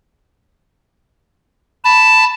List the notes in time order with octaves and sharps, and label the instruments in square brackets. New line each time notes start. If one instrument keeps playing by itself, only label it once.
[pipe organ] A5 [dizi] B5